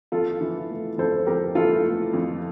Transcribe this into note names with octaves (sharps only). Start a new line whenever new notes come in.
F2 F4 A4
E3
A3
F2 A4 C5
F2 G4 A#4
E3 F4 A4
A3
F2